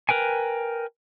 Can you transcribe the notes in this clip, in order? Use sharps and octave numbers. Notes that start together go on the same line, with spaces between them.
A#4 B4 G5 G#5